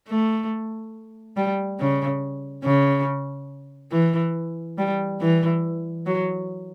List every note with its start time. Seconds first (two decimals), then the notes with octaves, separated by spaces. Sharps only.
0.08 A3
1.37 G3
1.80 C#3
2.65 C#3
3.93 E3
4.78 G3
5.21 E3
6.06 F#3